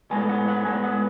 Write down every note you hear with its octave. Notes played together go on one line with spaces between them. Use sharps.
A2 G#3 B3 G#5
F#5
F#5
A2 G#3 B3 G#5
F#5